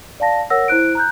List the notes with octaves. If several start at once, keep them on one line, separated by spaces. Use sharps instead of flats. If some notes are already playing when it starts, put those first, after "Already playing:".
D5 F5 A5 A#6
A#4 C#5 F#5 E6 A#6
E4 C5 F#6 D7
A#5 F#6 G6